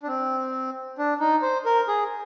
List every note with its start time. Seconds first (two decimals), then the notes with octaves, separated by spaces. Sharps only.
0.03 D4
0.07 C4
0.98 D4
1.20 D#4
1.42 C5
1.65 A#4
1.88 G#4